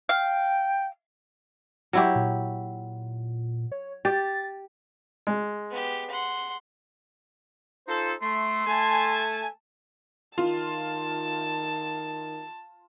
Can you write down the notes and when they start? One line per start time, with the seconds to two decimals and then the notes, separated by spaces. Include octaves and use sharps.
0.09 F5 G5
1.93 F#3 E4 G4
2.15 A#2
3.72 C#5
4.05 G4 A6
5.27 G#3
5.71 B3 G4
6.11 F#5 C6
7.88 D#4 F4 A4 C5
8.22 A3 C6
8.67 A3 G#5 A5
10.38 D#3 F4 A5